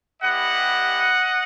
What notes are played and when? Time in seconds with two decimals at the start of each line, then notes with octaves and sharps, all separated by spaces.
0.22 G3 B3 E4 G4 D#5 F#5